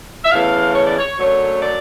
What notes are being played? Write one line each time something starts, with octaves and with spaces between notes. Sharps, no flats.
E5
E2 C#3 E3 A3 F5
C#5
D5
C#5
F#2 D3 F#3 A3 C#5
D5